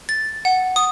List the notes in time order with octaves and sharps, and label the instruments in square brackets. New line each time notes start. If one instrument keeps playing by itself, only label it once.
[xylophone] A6
F#5
D#6